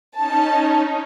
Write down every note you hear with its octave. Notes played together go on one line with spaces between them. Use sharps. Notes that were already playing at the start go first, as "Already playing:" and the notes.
C#4 D#4 A5